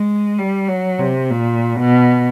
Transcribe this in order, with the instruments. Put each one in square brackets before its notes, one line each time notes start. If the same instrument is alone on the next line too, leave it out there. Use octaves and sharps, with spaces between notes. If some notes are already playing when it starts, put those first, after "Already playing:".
Already playing: [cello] G#3
G3
F#3
C3
A#2
B2